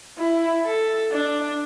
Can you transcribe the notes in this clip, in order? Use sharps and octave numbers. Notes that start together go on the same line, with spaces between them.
E4
A4
D4